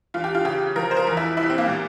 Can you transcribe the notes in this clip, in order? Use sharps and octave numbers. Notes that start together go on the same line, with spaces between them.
E2 F4
G4
F4
C#3 G4
F3 A#4
C5
A#4
E2
E4
C2 E4
C4
A#3
A#2